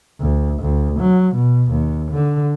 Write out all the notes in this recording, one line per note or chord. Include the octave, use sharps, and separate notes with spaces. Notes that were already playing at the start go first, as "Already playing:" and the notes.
D2
D2
F#3
B2
D#2
D3